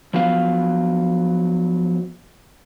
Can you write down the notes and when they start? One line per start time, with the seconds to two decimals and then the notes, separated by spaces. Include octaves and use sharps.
0.14 F3 F#3 B3 F5